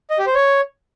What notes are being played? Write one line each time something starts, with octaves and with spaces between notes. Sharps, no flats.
D#5
G4
C5
C#5